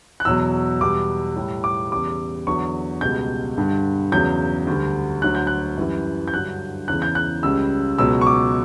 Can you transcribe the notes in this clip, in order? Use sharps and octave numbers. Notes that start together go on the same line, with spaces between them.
F#6
E2 B2 F#3 E6
E2 B2 G3 D6
A2 G3
D6
E2 C#3 G3 D6
E2 D3 F#3 C#6
C#2 B2 G3 G6
G2 D3 G3
E2 C#3 F#3 G6
D2 D3 G3
D2 D3 F#3 F#6
G6
F#6
F#2 E3 G3
G6
G2 D3 F#3 F#6
E2 C#3 E3 F#6
G6
F#6
C#2 C#3 G3 E6
C#2 B2 F#3 E6
C#6
D6